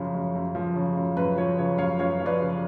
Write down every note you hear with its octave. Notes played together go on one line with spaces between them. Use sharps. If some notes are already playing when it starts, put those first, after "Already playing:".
Already playing: F#2 C#3 F3
F#2
F#2
F3
C#3
F#2
F#2 B4
F3 C#5
C#3 C#5
F#2 C#5 F5
F#2 C#5 F5
F3
B4 D5
C#3